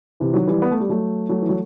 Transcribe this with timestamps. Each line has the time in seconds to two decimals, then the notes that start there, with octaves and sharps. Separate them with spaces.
0.20 C3 E3
0.34 D#3 F#3
0.47 E3 G3
0.62 B3
0.71 A3
0.80 G3
0.89 F#3 A3
1.29 F#3 A3
1.42 E3
1.49 F#3